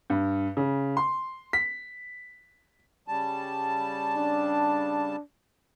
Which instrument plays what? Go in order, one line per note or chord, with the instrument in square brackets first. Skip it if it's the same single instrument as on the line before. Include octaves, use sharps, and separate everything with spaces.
[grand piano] G2
C#3
C6
B6
[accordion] C#3 G3 A5
[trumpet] D4